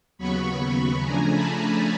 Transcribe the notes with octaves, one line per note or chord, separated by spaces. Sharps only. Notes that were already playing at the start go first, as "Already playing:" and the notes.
D#2 C#3 F#3 B3 B5 C#6
C#3 F3 A3 D4 G#5 A#5
A5 B5
G#5 A#5